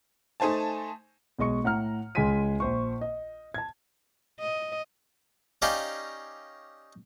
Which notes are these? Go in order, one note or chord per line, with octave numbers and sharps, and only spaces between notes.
A3 D#4 C5 G#5 A5
B1 G#3 D#5 C#6 C#7
A2 F#5 A#5 F6
C#2 G#3 G#5 C6 B6 D#7
A#1 C5 C#6
D#5
A5 G#6
D#5
C#4 D#4 G4 D5 D#5 F5